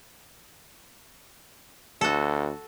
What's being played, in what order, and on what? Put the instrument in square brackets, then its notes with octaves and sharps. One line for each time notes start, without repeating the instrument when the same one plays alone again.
[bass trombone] D2 [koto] F#4 A4